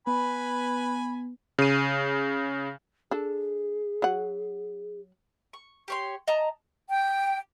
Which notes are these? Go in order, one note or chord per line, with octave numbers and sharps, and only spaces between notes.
B3 B4 G#5 B5
C#3 D#7
D4 G#4 A4
F#3 F#5
C#6
G4 C#5 C6
D#5 A5 A#5
G5